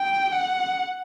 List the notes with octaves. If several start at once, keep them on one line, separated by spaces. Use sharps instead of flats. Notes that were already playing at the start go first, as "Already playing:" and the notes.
Already playing: G5
F#5